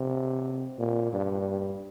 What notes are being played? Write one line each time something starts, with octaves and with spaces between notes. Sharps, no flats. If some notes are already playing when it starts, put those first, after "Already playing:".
Already playing: C3
A#2
G2